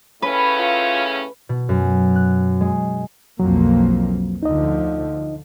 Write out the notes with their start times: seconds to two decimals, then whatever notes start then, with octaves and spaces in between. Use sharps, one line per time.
0.22 A2 C#3 C#4 B4
0.59 F4
1.49 B2
1.69 F#2
2.15 F#6
2.61 G#3
3.39 B1 F2 F#3 A#3
4.43 D2 D3 F3 D#4 D#5